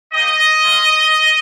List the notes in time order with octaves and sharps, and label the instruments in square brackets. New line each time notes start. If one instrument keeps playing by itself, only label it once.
[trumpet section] A#3 D#4 G4 D#5
G#3 C#4 F4